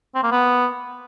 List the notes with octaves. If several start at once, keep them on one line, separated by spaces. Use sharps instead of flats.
C4
A#3
B3